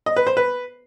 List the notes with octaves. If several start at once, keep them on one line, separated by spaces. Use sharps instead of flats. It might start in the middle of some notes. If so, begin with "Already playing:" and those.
D#5
B4
C5
B4